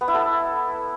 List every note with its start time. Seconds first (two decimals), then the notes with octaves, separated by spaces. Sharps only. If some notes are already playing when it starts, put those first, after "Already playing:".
0.01 B3
0.08 E4
0.15 A4